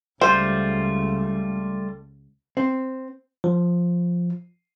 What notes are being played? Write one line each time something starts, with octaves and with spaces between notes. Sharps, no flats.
C#2 G3 A3 F4 C5
C4
F3